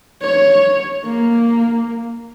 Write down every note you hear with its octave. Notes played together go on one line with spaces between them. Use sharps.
C#5
A#3